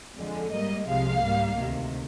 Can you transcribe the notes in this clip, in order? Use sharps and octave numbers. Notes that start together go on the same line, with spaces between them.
F2 D3 F3 G#3
G#2 G3 A#3 D#5
C2 C3 F3 G#3 F5
G#2 G3 A#3
D2 C3 D#3